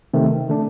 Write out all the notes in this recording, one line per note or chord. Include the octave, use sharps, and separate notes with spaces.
C3 D#3 A3 C4
D3 A3 D4